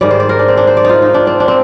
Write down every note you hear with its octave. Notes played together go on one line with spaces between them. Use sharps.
G#2 D#3 G3 D5
C5
D5
A#4
D4
C4
D4
C5
D5
D#4 F4
D#4
D4
C4
D4
C4